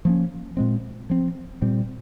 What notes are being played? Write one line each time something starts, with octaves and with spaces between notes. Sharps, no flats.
F3 A#3 C#4
A#2 G#3 C4
F3 C4
A#2 G3 C4